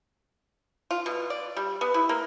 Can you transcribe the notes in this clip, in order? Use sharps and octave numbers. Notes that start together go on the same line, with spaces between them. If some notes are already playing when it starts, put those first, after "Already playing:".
F4
B2
D5
G3
B3
E4
A#3